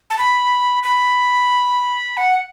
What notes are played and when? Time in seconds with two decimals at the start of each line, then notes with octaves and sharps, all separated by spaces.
0.10 A5
0.18 B5
0.83 B5
2.17 F#5